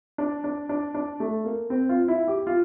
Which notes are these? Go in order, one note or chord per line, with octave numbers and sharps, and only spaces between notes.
D4
D4
D4
D4
A3
A#3
C4
F4
E4
G4
F4